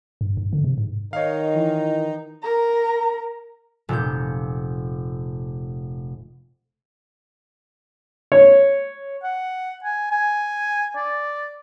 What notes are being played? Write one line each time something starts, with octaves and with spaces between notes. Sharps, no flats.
G2
G2
D3
C3
G#2
D#3 D#4 C#5 F5
E3
A#4 A#5
F1 A#2 G6
C#5
F#5
G#5
G#5
D5